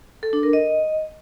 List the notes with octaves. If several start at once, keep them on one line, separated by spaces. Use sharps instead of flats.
A4
D4
A#4
D#5